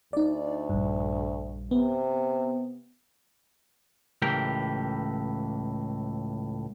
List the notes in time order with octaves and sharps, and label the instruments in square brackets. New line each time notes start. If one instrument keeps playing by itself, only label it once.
[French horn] D2 [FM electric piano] D#4 D5
[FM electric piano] A#1 G2
[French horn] C3 [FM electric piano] B3
[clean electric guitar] C#2 A2 E3 G4 A#4